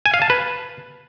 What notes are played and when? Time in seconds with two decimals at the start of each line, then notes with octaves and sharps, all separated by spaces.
0.06 G#5
0.14 F5
0.22 A5
0.30 B4